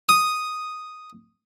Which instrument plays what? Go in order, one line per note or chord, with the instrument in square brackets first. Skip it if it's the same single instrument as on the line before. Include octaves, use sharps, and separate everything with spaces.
[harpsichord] D#6